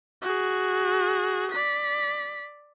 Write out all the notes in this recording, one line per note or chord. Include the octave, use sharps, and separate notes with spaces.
F#4 G#4
D5 B6